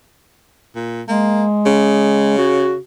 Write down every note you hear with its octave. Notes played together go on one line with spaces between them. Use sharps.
A#2
G#3 A#3
C#3
F#4